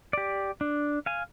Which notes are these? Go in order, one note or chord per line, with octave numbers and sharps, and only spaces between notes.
G4 D5
D4
F5 G#5